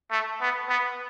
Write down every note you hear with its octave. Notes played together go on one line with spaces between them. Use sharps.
A3
B3
B3